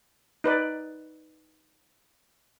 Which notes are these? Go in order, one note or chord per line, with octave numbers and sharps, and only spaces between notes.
D#4 B4 D5